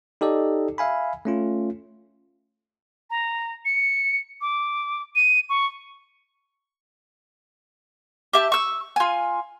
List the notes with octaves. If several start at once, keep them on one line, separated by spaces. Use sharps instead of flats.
D#4 G4 A4 D5 D#5
E5 F5 G#5 B5
A3 C#4 F4
A#5
C#7
D6
D#7
C#6
G4 E5 A5
C#6 E6
F4 G#5